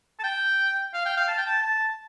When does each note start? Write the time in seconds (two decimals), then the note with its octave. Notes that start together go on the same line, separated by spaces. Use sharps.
0.19 A5
0.24 G5
0.94 F5
1.06 G5
1.17 F5
1.28 A5
1.38 G5
1.46 A5
1.63 A5